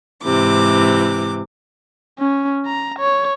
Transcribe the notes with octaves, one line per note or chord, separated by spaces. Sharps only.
G#2 C3 E3 D6
C#4
A#5
C#5